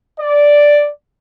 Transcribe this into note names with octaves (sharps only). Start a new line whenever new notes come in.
D5